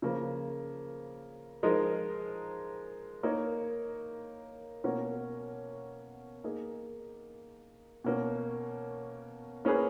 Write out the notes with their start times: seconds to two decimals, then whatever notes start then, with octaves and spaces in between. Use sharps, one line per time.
0.02 C#3 F3 A#3
1.63 F3 G#3 D#4 A#4
3.23 A#3 D#4 A#4 C#5
4.84 B2 A#3 C#4 F#4 A#4
6.44 A#3 D#4 G#4
8.04 B2 A#3 C#4
9.65 A#3 C#4 G#4 B4